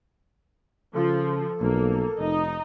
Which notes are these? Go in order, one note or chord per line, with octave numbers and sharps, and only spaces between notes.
C#3 F3 A4
B1 A#3
F1 D#4 D#5